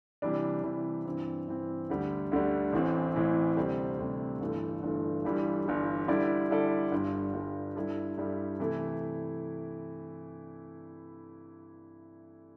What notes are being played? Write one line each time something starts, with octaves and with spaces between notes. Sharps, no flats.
C3 E3 G3 D4
C3 E3 G3 D4
G2 E3 C4
G2 E3 C4
D2 D3 G3
D2 D3 G3
A1 A2 E3 C4
A1 A2 E3 C4
D2 C3 G3 C4
D2 C3 G3 C4
G1 G2 E3 A3
G1 G2 E3 A3
G1 G2 E3 G3
G1 G2 E3 G3
D3 G3 E4 A4 D5
D3 G3 E4 A4 D5
G1 G2 G3
G1 G2 G3
G2 G3 E4 A4
G2 G3 E4 A4
C3 E3 A3 E4